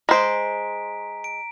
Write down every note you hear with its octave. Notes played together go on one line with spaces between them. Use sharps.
G#3 C5 A#5 B6 D7
D7